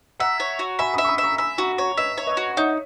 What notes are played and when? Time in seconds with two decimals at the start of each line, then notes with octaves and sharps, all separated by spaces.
0.20 E5 F#5 A#5
0.40 C#5
0.59 F#4
0.79 E5 G#5 B5
0.94 E5 B5 D#6
1.04 C#6
1.08 B5 D#6
1.18 E5
1.23 A#5 C#6
1.38 E5 G#5 B5
1.58 F#4 A#5 C#6
1.77 C#5 A#5 C#6
1.97 B4 D#5 E5
2.18 C#5
2.27 B4 D#5
2.37 F#4
2.57 D#4 C#5 E5